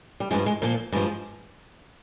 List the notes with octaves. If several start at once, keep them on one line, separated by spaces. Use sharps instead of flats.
G3
G2 F3 G#3
G#3
A#2 F3 A#3
G2 F3 G#3